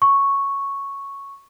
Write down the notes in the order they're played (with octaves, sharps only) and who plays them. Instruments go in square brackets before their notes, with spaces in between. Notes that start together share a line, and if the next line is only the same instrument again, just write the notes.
[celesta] C#6